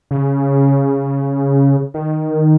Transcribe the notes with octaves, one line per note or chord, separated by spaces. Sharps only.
C#3
D#3